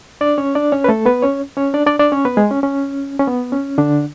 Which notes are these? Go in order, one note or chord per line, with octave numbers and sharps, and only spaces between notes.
D4 D5
C#4 C#5
D4 D5
C#4 C#5
B4
A3 A4
B3 B4
C#4 C#5
C#4 C#5
D4 D5
D4 D5
D4 D5
C#4 C#5
B3 B4
G#3 G#4
C#4
C#4
C#4
B3
C#4
D3 D4